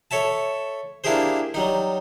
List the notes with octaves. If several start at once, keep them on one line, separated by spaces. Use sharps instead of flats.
A4 C#5 E5 A5
A#3 D4 E4 G4 G#4 C5
F#3 G3 D#4